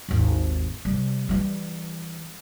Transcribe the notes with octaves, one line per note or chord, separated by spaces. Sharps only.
G#1 D#2
C3 G3
E3 G3